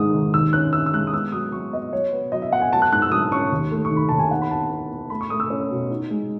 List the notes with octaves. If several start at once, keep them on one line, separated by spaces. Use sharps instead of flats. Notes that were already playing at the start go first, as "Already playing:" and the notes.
Already playing: G#2 D#3 G#3 D#6
D#3
D#2 E6
C#4 F#6
C#4 E6
E6
G#3 F#6
D#6
B3 E6
F#3 D#6
F#3 C#6
B3 D#5
F#3 C#5
B3 B4
F#3 D#5
E5
B3 F#5
G#5
F#3 A5
F#6
G#2 F#6
E6
F#3 D#6
C#4 C#6
D#2
A3
C#6
D#3
B5
D#2 A5
G#5
B3 F#5
B5
B3 A5
B3
B3
A3 B5
C#6
A3 D#6
E6
C#4
B2
D#4
G#3